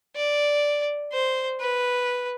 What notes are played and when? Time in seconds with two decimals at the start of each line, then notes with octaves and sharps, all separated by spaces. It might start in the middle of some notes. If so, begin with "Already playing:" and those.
0.16 D5
1.12 C5
1.60 B4